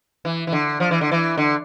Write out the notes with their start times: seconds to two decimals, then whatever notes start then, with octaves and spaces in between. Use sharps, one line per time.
0.25 E3
0.47 E3
0.52 D3
0.80 F3
0.91 E3
1.01 D3
1.11 E3
1.37 D3